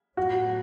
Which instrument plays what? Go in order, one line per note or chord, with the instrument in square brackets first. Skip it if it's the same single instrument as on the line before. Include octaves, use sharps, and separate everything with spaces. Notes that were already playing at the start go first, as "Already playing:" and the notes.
[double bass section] A2 F#3 B3 [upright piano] F#4